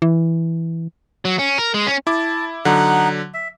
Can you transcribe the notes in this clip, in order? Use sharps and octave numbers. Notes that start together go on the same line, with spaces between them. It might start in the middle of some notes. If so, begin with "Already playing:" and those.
E3
F#3
C#4
A#4
G#3
C#4
E4 A5 D6
D3 F#3 D#4 F#5
E5